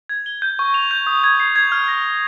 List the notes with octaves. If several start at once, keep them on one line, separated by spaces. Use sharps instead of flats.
G#6
G7
G6
C#6
F7
G6
D#6
G#6
C7
G#6
F6
A#6
F6